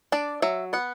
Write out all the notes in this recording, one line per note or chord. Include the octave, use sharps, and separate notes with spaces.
D4 D5
F#3 E5
B3 F#5